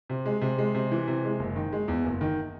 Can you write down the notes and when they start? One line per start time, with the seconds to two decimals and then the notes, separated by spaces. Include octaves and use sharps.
0.10 C3
0.26 G#3
0.41 C3
0.58 G#3
0.75 C3
0.92 E3
1.07 C3
1.24 G#3
1.40 F#1
1.56 D#3
1.73 G#3
1.88 E2
2.05 F#1
2.21 D#3